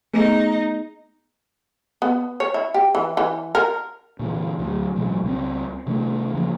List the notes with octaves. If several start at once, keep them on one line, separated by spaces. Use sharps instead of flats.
A3 B3 D#4 G#4
B3
C#5
E4
G4
E3
E3
A#4
A#2 D3 E3
D2 D3 F#3
A1 B2 F#3 G#3
C#2 C4
C3 D#3 A3 D4
C#3 F3 A#3